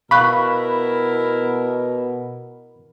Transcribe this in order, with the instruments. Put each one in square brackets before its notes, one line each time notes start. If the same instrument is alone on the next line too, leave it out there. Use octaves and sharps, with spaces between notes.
[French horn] B2 [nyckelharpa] E4 A#4 [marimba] F5 C#6 F#6 [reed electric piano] B5